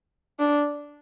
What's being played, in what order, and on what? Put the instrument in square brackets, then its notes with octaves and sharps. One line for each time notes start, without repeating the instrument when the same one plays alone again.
[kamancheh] D4